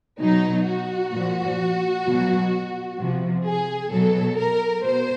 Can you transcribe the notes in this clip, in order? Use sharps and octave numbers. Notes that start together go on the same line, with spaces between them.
B2 F#3 D#4
F#4
A#2 F3
B2 F#3
C3 F3
G#4
B2 F#3 A4
A#4
B2 C5